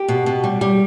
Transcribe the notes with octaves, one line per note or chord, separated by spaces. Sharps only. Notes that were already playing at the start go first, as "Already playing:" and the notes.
Already playing: G4
B2
B2
G3
G3